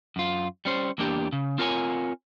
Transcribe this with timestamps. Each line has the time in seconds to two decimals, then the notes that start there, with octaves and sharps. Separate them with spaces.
0.16 F#2 F4
0.65 G3 C#4 C5
0.98 E2 A#3 D4 G4
1.33 C#3
1.58 C4 F4 A#4 C#5 G#5